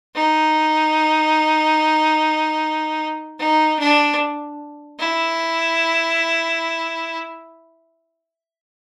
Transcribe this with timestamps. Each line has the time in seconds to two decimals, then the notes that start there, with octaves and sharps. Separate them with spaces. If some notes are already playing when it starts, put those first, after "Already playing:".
0.15 D#4
3.39 D#4
3.79 D4
5.00 E4